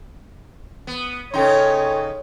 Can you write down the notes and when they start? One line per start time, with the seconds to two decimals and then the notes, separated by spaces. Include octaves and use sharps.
0.87 B3
1.34 C#3 D#4 A4 C#5 G5 C6